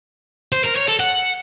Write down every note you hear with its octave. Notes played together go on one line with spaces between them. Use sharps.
C5
A#4
C#5
A4
F#5